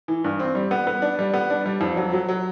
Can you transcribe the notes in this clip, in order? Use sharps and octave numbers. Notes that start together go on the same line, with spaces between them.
E3
G2
C4
G3
B3
B3
D4
G3
B3
D4
G3
F2
F#3
F#3
F#3